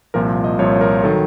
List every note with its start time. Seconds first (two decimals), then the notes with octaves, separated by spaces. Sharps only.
0.14 C2 A#2 F3 A#4
0.44 D#5
0.59 C2 A#2 F3 C#5
0.81 A#4
1.04 D#3 F#3 A4